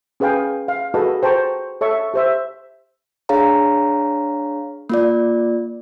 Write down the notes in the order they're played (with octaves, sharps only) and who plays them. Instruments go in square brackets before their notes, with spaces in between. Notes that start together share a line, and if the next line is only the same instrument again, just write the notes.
[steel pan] C#4 G#4 B4 F5 G5 G#5
F5
F#4 G#4 A4 B4 D#5 A5
A4 C5 G5 A5 A#5 C#6
A4 C#5 E5 A5 C#6
G4 C5 E5
[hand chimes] D4 G#4 C#5 F5 A#5
A#3 F4 D5